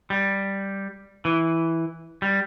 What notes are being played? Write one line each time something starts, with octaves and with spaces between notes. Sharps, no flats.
G3
E3
G3